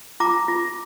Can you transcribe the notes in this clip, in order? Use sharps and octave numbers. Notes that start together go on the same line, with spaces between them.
F4 A#5 D6
F4